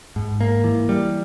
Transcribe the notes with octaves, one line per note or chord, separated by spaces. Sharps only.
G#2
A#3
E3
G3